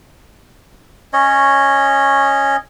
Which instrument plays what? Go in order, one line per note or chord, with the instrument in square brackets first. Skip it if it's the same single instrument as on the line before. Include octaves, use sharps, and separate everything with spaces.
[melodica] C#4 C#5 D#5